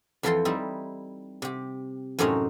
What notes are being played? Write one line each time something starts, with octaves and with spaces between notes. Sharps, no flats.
F2 E3 F3 A4 G5 C6
G3 C4 D#4 E4
C3 G4
F#2 A2 C3 C4 C#4 D#4